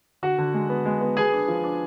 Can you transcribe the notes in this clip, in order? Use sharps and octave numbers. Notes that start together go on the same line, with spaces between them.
D3 F#4 F#5
D3
G#3
B3
G#3
B3
B3 G#4 G#5
D4
F3
D4